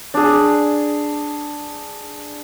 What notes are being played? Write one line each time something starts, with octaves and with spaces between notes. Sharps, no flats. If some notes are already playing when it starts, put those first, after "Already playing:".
D4 G#4